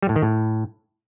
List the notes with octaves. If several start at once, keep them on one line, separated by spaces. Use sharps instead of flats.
G3
A2
D#3
A2